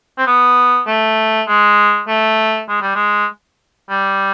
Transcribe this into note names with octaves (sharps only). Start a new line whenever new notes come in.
C4
B3
A3
G#3
A3
G#3
G3
G#3
G3